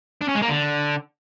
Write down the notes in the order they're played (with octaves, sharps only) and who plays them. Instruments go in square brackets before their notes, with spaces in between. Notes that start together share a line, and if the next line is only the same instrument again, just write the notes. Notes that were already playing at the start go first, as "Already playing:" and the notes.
[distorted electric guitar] D4
C#4
G#3
A#3
D3